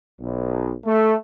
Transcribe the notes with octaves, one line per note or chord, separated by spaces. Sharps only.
B1
A3